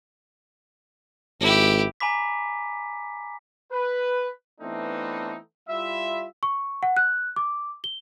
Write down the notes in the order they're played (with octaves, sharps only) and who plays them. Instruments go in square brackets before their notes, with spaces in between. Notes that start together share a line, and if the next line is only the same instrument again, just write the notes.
[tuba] G#1 [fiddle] E4 G4
[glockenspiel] G#5 A#5 B5 D6 B6
[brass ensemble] B4
E3 A3 B3 C4 D4 D#4
G3 E4 F4 E5
[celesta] C#6
F#5
F#6
D6
G7